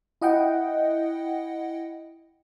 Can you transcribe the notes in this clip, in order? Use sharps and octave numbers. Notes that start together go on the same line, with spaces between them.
E4 D#5 F#5 G5